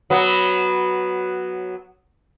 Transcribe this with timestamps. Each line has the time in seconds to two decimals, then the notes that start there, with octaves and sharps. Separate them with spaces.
0.10 F#3 B3